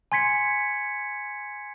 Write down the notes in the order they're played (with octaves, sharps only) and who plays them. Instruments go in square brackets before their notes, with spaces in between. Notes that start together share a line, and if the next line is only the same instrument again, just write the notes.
[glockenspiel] G#5 C6 G#6 B6 C#7